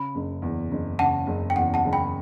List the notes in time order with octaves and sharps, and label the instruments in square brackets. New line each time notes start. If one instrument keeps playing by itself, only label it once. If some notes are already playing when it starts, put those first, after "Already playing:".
Already playing: [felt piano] C#3 [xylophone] B5
[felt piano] F#1
E2
F#1
[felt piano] C#3 [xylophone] F#5 A5
[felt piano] F#1
[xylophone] G5
[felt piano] E2 [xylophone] F#5
[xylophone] F#5 A5
[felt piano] F#1
[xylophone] G5 B5